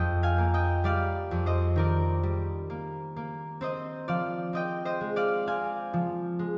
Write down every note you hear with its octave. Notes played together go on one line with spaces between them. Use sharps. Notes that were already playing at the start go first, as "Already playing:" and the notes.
Already playing: F2 D#5 G5
F5 G#5
A#3
D#5 G5
G3 D5 F5
F2
C5 D#5
D#3 A#4 D5
G3
A#3
A#3
C4 C5 D#5
F3 D5 F5
C4 D#5 G5
C5 D#5
G#3
D5 F5
C4 F5 G#5
F3
G#3